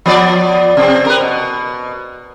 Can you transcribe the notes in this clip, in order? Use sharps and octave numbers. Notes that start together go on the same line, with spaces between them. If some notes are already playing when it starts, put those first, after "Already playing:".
F3 B3 D5
C3 C4
A#4 B4
B2